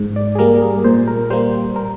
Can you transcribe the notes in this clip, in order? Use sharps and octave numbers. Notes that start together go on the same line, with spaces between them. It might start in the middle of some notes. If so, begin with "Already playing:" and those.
Already playing: G#2
D5
G#4
G3 A#3 A#4
G#4
A#2 C5
A#4
G3 A#3 C5
A#4